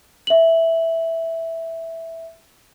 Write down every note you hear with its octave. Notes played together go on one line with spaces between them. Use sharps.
E5 F#7